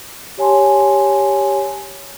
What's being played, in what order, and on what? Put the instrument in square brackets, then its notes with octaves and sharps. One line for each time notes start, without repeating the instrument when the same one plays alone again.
[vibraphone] G4 C#5 G#5 A5 C6